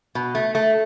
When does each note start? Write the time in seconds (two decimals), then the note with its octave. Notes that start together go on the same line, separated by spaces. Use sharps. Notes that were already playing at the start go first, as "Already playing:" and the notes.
0.15 B2
0.35 A3
0.55 A3